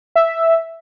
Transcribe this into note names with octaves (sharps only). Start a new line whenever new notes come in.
E5